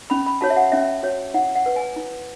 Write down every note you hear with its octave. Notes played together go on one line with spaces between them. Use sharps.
C#4 B5
B5
F#4 C#5 A5
E5
F#5
C#4 E5
F#4 C#5
E4 F#5
F#5
B4
G#5
E4